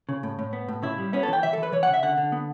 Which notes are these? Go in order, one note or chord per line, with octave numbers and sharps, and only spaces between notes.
C#3
A2
A2
B3
A2
C#3 E4
G3
B3 C#4
A4
E3 G5
E3 E5
E3 A4
B4
E3 C#5
F#5
C#3
E5
D3 F#5
D3
B3